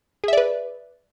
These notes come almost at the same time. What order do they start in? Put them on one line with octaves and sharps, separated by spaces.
G#4 E5 D5 B4